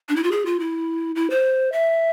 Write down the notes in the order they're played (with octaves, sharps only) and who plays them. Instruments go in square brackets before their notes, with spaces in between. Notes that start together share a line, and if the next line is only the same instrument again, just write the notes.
[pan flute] D4
E4
F4
G#4
F4
E4
E4
C5
E5